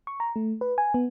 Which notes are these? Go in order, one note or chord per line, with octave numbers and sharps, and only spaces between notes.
C#6
A#5
A3
B4
G#5
B3